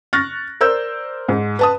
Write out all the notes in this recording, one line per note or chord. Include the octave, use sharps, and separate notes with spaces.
C#6 F6 F#6 A6 A#6
A#4 C5 D5 E6 G6
G#2
B4 A5 D#6